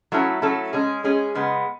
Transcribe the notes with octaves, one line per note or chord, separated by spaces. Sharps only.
F#3 A3 C#4 E4 A4
F#3 A3 C#4 E4 A4
G#3 C#4 G#4
G#3 C#4 G#4
C#3 G#3 B3